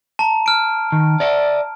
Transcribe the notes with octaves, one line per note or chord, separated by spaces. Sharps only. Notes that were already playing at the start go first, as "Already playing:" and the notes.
A5 A#5
F6 D7
D#3
D5 E5